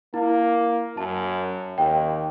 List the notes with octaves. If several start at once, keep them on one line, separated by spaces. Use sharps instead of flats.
A#3 E4
F#2 A5
D#2 G5